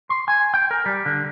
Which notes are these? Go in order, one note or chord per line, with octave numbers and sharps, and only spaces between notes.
C6
G#5
G5
A#4
G3
D3